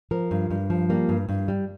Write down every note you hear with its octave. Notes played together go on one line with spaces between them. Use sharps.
F3 A#4
G2
G2
F3
G3 A#3
G2
G2
G3